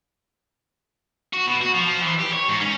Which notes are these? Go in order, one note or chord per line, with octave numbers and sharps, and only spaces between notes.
F#4
B2
F#4
F3
E3
G4
C#5
G#2
C#4